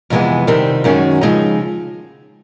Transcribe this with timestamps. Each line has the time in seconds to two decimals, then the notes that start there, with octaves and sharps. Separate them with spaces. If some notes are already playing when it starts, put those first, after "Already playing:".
0.10 F2 C3 E3 G#3 B3
0.47 C3 D#3 G3 C4
0.84 F#2 D#3 G#3 C#4 F#4
1.21 C#3 F3 G#3 C4 D#4